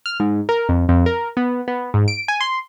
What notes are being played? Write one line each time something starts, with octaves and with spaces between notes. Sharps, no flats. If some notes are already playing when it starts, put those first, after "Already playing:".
F6
G#2
A#4
F2
F2
A#4
B3
B3
G#2
D7
G#5
C6